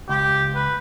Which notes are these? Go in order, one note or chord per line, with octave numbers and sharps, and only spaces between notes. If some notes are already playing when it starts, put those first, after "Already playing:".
C#2 G4
B4